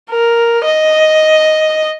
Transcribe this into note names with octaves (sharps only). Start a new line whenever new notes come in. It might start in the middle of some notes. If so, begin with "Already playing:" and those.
A#4
D#5